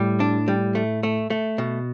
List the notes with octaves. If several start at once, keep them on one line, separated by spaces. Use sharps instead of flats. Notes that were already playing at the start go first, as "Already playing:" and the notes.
Already playing: A2 G3
D4
G3
A3
A3
A3
B2